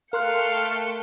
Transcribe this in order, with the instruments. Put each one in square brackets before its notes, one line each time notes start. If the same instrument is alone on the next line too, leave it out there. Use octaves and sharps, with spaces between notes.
[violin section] A3 G5 C#7 [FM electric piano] A#4 C6 F#6 [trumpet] F5